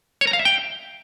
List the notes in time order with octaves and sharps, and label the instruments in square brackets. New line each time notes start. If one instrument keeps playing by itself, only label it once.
[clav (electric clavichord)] C#5
A#5
F5
E5
G5